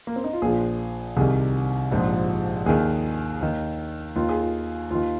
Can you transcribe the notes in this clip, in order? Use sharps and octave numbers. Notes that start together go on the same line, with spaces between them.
A#3
C4
D#4
F4
A#1 A#2 F3 G#4
C2 C3 D#3 G#4
A#1 G#2 F3
D#2 D#3 G#4
D#2 D#3
D#2 D#3 F4
G#4
F4
D#2 D#3 F4